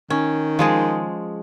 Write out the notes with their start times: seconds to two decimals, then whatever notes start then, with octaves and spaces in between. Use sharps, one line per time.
0.10 D#3 C#4
0.59 F3 G#3 G#4